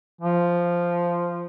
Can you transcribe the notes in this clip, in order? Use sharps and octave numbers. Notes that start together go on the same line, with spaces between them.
F3